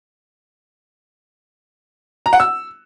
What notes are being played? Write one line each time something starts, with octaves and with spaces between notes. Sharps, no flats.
A#5
F#5
E6